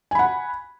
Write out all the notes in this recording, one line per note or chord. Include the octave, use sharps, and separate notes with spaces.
F#5 G#5 B5